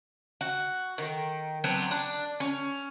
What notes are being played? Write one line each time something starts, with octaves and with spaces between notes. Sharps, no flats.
F#4
D#3
F#3 B3 C4 D4
D4
C#4